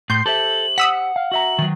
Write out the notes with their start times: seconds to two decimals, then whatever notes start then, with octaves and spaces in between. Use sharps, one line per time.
0.10 A2 C6 G6 C7
0.26 G4 A4 C5 E5 F#7
0.78 F#5 D#6 E6 B6
1.16 F5
1.32 F#4 E5 A#5 F#7
1.59 D#3 F#3